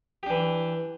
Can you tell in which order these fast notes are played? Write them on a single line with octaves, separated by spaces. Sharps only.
G4 D4 E3